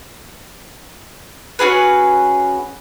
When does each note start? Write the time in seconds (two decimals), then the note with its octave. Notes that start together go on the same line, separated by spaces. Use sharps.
1.59 C#4 F#4 G#4 B4